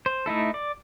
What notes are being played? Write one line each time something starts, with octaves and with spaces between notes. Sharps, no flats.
C5
A3 D#4 E4 A4
D5